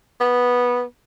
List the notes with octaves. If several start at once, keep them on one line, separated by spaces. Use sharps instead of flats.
B3